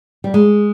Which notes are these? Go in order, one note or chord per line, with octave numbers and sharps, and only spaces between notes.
G3
G#3